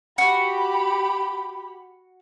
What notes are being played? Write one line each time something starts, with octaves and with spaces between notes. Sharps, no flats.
F#4 G4 B5